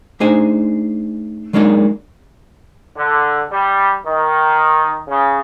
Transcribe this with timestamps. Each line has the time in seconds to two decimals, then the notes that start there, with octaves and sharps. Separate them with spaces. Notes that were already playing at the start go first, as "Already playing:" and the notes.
0.20 A3 D4 D#4 G#4 C5 G#5
1.53 F#3 G#3 A#3 D4 D#4 G#4
2.97 D3
3.50 G3
4.04 D#3
5.08 C#3